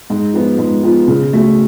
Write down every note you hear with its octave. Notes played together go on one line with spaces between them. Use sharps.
G#2
F3 B3 F4
G#2
F3 B3 F4
C#3
F#3 A3